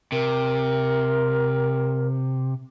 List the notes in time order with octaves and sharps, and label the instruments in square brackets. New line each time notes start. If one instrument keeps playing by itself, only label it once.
[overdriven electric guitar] C3 [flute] A#4